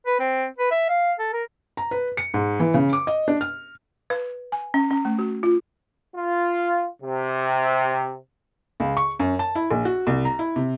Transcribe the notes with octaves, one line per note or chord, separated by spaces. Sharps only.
B4
C4
B4
E5
F5
A4
A#4
A#5
B4
C#7
G#2
E3
C#3
D6
D#5
D4
F6
B4
G#5
C#4
C#4
A3
F#4
F4
F4
C3
C#2
C#6
F#2
A5
E4
A#1
F#4
C2
A#5
E4
C3